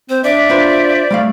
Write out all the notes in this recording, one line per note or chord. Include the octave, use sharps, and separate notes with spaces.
C4 C5
D4 D5 E5
D4 F4 B4 C5
G3 A3 F5